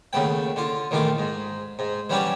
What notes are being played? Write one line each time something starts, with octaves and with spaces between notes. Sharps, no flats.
D#2 C#3 A3 B3 G5
D3 F4
A#1 D#3 E3 A3 F4 D6
G#2
G#2
E3 F#3 G3 C#4 D4 G4